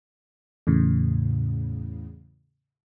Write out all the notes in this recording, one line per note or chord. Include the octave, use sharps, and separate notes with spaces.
E2 A2 C#3